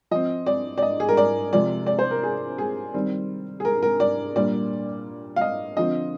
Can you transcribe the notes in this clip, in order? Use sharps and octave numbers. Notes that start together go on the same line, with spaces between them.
F3 C4 D#5
D5
D5
D#5
G#4
A#4
D5
C3 F3 G#3 D5
D5
C5
A#4
G#4
G#4
D#3 G3 C4
G#4
A#4
A#4
D5
A#2 G3 A#3 D4 D5
F5
D#5
D3 F3 C4 D#5